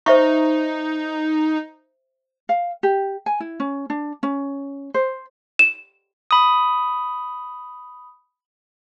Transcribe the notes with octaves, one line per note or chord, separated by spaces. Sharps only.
D#4 C5 E5 C#6
F5
G4
G#5
E4
C#4
D4
C#4
C5
E7
B5 D#6